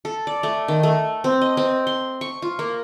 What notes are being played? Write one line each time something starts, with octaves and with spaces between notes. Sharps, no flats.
A4
D5
A3
D#3
A3
C4
D#5
C4
C6
C#6
F4
A#3